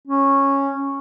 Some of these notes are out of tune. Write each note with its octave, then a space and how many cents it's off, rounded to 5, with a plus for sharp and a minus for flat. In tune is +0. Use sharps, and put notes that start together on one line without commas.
C#4 -10